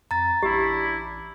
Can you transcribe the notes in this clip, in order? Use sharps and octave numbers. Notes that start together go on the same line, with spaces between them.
F2 A#5 A6
A1 D4 E4 G4